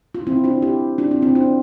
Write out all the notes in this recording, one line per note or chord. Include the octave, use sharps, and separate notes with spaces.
F4
C4 E4
D4 F4
E4 G4
D4 F4
C4 E4
C4 E4
D4 F4